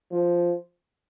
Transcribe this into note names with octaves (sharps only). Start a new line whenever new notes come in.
F3